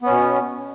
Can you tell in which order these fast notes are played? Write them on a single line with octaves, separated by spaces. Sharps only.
B3 C#4 B2